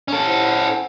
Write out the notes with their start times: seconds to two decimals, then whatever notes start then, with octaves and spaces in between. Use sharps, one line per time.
0.08 C#4 A4
0.26 E4 C5 F#5